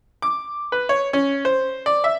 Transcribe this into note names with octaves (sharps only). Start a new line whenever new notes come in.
D6
B4
C#5
C#4
C5
D5
E5